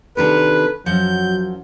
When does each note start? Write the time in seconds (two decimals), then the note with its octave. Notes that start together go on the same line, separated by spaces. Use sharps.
0.17 C3 D#3 D4 A4 B4
0.86 F#2 F3 F#3 F#5 G6